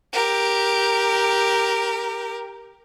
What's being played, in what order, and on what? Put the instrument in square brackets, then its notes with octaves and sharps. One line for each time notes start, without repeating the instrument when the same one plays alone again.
[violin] G4 A#4